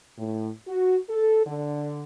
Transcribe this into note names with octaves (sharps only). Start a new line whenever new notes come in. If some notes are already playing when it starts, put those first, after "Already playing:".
A2
F#4
A4
D3